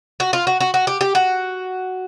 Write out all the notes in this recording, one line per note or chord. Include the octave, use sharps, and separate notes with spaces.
F#4
F4
F#4
F#4
F#4
G4
G4
F#4